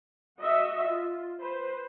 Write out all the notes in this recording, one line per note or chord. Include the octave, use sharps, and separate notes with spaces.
F#4 D#5 E5
F4
B4 C5